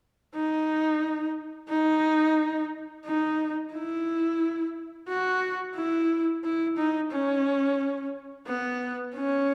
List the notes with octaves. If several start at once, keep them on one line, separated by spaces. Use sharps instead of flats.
D#4
D#4
D#4
E4
F#4
E4
E4
D#4
C#4
B3
C#4